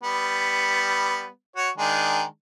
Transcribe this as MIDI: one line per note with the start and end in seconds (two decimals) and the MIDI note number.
0.04 1.28 55
0.04 1.28 59
1.56 1.69 66
1.56 1.69 73
1.78 2.22 51
1.78 2.22 56
1.78 2.22 62